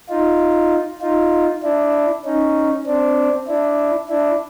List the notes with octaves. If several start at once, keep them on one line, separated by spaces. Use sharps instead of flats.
D#4 F4
D#4 F4
D4 E4
C#4 D#4
C4 D4
D4 E4
D4 E4